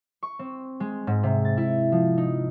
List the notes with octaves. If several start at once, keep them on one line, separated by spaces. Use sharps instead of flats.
C#6
C4
G#3
G#2
C3
A6
E4
F3
D#4